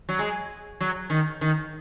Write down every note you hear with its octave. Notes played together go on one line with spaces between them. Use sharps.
F#3
G#3
F#3
D#3
D#3